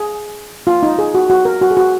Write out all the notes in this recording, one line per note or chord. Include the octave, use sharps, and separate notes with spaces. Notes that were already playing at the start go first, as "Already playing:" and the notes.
Already playing: G#4
F4
D#4
G#4
F#4
F#4
A#4
F#4
G#4
F#4